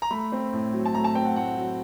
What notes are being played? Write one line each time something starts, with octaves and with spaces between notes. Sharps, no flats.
A#5
A3 B5
C4
A2
F#3
A5
A3 A#5
A5
C4 G5
F#5
A2 F#5
F#3